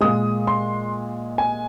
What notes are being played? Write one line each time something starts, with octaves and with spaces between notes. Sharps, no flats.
A#2 G#3 D#6
C6
G#5